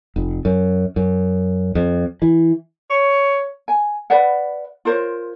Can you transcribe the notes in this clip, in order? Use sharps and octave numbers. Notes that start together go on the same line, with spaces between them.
F1
F#2
F#2
F2
E3
C#5
G#5
B4 D5 E5 F#5
F4 A#4 C5 C#5